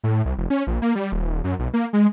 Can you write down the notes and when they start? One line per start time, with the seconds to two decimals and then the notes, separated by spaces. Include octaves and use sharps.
0.03 A2
0.25 C2
0.38 F1
0.50 C#4
0.67 A#1
0.82 A#3
0.95 G3
1.12 D#1
1.44 F#2
1.59 B1
1.74 A#3
1.93 G#3